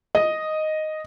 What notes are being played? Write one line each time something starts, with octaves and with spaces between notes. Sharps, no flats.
D#5